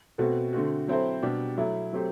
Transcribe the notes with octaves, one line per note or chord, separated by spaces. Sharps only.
B2 A3 C4 F#4 A4
D3 A3 C4 F#4
F#3 C4 E4 A4 C5
B2 G3 D4 G4
F#3 A3 E4
F#3 A3 C4 G4 C5